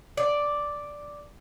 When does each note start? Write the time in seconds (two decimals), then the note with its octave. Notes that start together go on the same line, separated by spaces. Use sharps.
0.17 D5